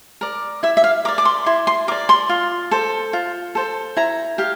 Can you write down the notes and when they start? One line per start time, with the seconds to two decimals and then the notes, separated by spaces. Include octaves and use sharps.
0.21 A#4 D5
0.63 E4 E5
0.77 E5
0.84 F5
1.05 A#4 D6
1.08 D5
1.18 D6
1.25 C6
1.46 E4 C6
1.67 C6
1.88 A#4 D6
1.92 D5
2.09 C6
2.29 F4
2.71 A4 C5
3.13 F4
3.55 A4 C5
3.97 E4 A#5
4.38 G4 F5